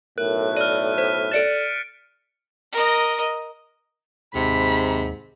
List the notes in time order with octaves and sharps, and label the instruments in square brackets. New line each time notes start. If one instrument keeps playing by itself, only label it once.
[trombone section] B1 A2 [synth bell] A#4 [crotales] F#6
[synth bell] D5 [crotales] F6 D#7
[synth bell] C5 [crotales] B6
[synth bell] A4 D5 E7 [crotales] A6 C#7 D7
[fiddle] A#4 D#5
[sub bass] D#2 [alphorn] G#2 [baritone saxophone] C3 [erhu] B5